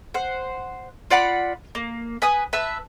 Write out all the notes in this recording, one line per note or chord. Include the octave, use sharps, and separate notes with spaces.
C5 F#5
F4 D5 F#5 B5
A#3
B4 G#5 D#6
B4 E5 A5